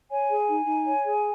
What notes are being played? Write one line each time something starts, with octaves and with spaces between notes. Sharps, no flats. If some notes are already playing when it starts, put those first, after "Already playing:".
C#5 G#5
G#4
D#4
D#4
C#5
G#4